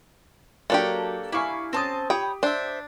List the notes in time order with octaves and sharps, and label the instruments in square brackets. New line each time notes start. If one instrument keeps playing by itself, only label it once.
[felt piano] F#3 A5 [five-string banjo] A#3 D4 G4 [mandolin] A4 C#5 G5
[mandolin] E4 F5 [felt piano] G#5 C#6 D6
[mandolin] C4 C5 A5 [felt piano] C#4 D#6
[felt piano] G4 [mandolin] C#5 B5 D#6 [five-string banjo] G5
[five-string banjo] D4 [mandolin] C5 E5